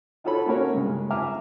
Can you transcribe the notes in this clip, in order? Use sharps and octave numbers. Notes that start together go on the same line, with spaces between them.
D#4 F4 F#4 A4 C#5 B5
A3 A#3 C#4 F#4 A#4 C#5
G2 C#3 G#3
E5 F5 G#5 A#5 D6 F6